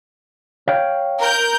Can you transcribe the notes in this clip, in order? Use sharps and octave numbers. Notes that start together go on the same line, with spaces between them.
C#5 F5 G5
A#4 G6